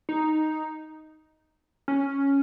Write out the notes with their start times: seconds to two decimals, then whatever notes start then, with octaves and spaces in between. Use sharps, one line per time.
0.09 D#4
1.88 C#4